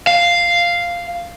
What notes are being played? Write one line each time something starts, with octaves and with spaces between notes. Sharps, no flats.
F5